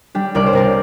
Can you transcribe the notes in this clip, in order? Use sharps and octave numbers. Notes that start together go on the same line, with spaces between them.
G3 D4 G4
C2 A#4 D5
C5
C3 A#4 D5